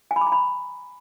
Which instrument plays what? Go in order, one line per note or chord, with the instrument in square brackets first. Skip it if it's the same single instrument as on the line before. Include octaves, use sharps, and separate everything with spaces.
[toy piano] G#5
B5
D6
A#5
B5